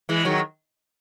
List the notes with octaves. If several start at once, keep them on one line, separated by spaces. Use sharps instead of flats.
E3 G#3
D#3 F#3